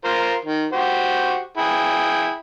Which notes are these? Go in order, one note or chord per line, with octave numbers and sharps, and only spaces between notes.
F4 A#4 C5
D#3
F#4 G4 C5
E4 G#4 G5